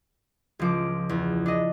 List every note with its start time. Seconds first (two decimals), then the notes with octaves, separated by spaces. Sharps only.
0.59 C#2 F3 D6
1.09 E2
1.46 D4 D#5